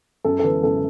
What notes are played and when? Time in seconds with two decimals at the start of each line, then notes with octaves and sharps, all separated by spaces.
0.25 F#2 A4
0.39 A4
0.44 E3 B4
0.63 F#2 A4